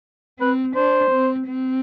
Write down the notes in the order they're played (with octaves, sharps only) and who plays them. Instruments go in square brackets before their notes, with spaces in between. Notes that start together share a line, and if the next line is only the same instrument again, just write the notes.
[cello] C4 [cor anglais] B4
[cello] D4 [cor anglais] C5
[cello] C4
C4